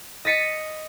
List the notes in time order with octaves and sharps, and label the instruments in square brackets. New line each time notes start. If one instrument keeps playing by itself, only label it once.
[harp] D#5 A6 B6 C#7 D#7